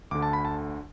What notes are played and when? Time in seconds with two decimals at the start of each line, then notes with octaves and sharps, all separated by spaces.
0.11 D2 D3 D6
0.22 A5
0.33 B5
0.45 A5